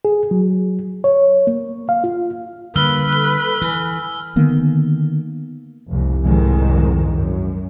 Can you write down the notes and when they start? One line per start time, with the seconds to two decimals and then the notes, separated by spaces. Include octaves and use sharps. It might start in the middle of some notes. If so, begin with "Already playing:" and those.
0.05 G#4
0.31 F#3
1.04 C#5
1.47 A#3
1.89 F5
2.04 F4
2.76 D3 G3 A#3 B4 E6 F6 G7
3.13 A4 G7
3.62 E3 G#5
4.36 D3 D#3 A#3 B3
5.89 F1 C2
6.23 C2 F2 G#2 D#3 G#3
7.13 F#2